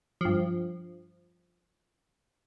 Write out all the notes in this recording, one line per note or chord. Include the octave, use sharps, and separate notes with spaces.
G2 F3